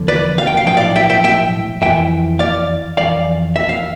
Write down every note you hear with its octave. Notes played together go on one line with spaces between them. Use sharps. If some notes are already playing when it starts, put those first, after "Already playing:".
Already playing: E2 D3 F3
B4 D5
F5
G5
F5
B1 A2 F3 G5
D5 F5
E5 G5
E5 G5
E5 G5
F2 E3 E5 G5
D5 F5
F2 E3 D5 F5
E5
F5